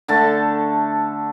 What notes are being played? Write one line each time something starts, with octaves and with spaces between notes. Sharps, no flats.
D3 A3 A5